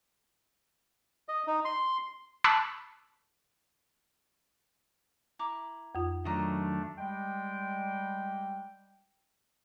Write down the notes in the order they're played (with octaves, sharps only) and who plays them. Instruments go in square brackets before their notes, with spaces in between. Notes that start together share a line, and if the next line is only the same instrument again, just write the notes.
[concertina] D#5
D#4
C6
[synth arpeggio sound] A5 B5 C#6 D6 E6 F#6
[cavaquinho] E4 A#5 D6
[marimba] F2 F4
[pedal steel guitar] D#3 F#3 [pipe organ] A3 D4 [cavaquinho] D#5 A#5
[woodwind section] G3 G#3 G5